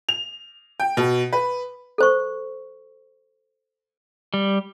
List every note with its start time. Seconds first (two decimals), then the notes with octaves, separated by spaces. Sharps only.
0.09 F7
0.80 G5
0.97 B2
1.33 B4
1.98 A4 C5 C#6
4.34 G3